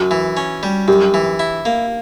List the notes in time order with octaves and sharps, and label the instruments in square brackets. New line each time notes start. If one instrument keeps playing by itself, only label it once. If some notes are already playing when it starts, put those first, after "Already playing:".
Already playing: [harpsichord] F#2 [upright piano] F#4
[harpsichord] E3
C#4
G3
[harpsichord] F#2 [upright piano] G4
[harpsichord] E3
E4
A#3